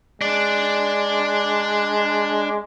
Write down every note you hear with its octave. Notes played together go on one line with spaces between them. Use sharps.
G#3 D4 D5